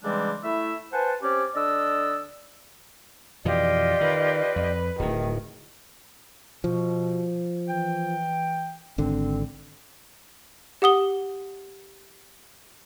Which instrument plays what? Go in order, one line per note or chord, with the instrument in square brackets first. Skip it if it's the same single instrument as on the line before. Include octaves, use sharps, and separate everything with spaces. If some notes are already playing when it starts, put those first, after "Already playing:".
[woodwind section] C#3 E3 G3 G#3 C4 D4
A3 E4 E5
B4 C5 F#5 G#5 A5
C4 C#4 G4 C#5 D5
D3 D4 D5 D#5 E6
[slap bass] F2 B2 E3 [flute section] F4 G4 D#5 [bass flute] D5
[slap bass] D#3 [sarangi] B4
[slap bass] F2
[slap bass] D1 A2 [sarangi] D#3 [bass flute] A3
[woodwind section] B2 [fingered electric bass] F3
[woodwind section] E3 G5
[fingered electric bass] G#1 D3 [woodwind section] C4
[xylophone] G4 F#5 D#6 G7